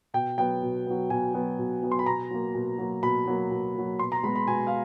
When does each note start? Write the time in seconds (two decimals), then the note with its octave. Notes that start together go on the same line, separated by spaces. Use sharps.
0.14 B2 G5
0.38 F#3 B3 G5
0.62 B2
0.87 F#3 B3
1.10 B2 G#5
1.34 F#3 B3
1.59 B2
1.83 F#3 B3
1.92 C6
1.99 B5
2.06 B2 A#5
2.31 F#3 A#3
2.55 B2
2.78 F#3 A#3
3.03 B2 B5
3.27 F#3 A#3
3.51 B2
3.75 F#3 A#3
3.99 B2 C6
4.12 A#5
4.24 G#3 B3 B5
4.36 B5
4.48 B2 G#5
4.67 F5